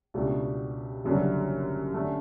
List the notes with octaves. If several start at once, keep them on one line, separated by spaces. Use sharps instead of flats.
C#2 B2 A3 D4 G4
F#1 F#2 D3 G3
D3 A3 C#4